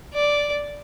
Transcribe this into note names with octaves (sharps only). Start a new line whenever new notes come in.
D5